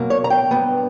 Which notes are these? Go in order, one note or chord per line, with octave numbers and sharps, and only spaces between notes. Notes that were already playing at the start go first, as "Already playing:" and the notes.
Already playing: B2 F#3 A#3
C#5
A#5
G5
G2 F#3 B3